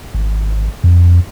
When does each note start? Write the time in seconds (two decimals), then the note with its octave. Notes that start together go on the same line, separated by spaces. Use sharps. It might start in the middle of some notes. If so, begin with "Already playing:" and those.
0.14 G#1
0.84 F2